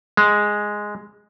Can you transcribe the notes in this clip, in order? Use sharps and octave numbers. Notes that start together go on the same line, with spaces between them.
G#3